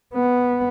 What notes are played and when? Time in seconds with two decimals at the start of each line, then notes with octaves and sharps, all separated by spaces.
0.15 B3